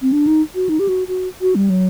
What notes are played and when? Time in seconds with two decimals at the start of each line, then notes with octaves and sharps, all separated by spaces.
0.02 C4
0.12 D4
0.27 D#4
0.55 F#4
0.69 D#4
0.79 G4
0.89 F#4
1.08 F#4
1.41 F#4
1.55 G3
1.70 F#3